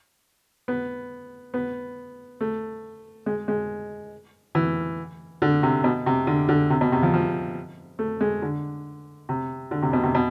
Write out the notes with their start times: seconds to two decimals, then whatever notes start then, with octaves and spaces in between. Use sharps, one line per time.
0.68 B3
1.54 B3
2.41 A3
3.26 G#3
3.48 G#3
4.55 E3
5.42 D3
5.63 C3
5.84 B2
6.06 C3
6.27 D3
6.49 D3
6.70 C3
6.81 B2
6.92 C3
7.02 F3
7.14 F3
7.99 A3
8.21 G#3
8.42 D3
9.29 C3
9.71 D3
9.82 C3
9.93 B2
10.03 C3
10.15 B2